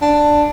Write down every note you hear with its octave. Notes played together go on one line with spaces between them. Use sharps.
D4